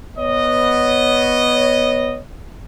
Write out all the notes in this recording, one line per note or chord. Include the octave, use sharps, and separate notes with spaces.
B3 C#5 D#5